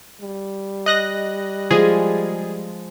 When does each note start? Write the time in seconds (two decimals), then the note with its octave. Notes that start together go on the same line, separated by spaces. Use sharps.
0.21 G3
0.86 D#5 F#6 A#6
1.71 F3 G#3 G#4